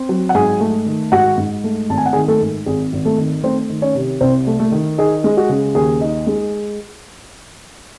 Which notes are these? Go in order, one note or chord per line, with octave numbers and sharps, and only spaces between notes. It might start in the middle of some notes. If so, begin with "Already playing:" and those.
Already playing: C4
F#3
F#5
G#2 G#4 G#5
A3
D#3
G#2 F#4 F#5
G#2
A3
G#1 A5
G#5
F#5
D#3 G#4 G#5
A3 A4
G#2
G#1 G#4
G#1
A3 A4
D#3
A3 C4 C5
D#3
C#4 C#5
C3
C2 C4 C5
A3
A3 A4
D#3
D#4 G#4
G#3
F#4
C#3
D#2 G#4
D#4
G#3